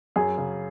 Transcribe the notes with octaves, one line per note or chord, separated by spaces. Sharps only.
F#2 G#4
C#3